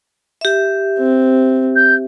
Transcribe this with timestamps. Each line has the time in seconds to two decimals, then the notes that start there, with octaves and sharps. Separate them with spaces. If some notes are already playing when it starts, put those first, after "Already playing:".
0.41 G4 E5
0.98 C4
1.76 G6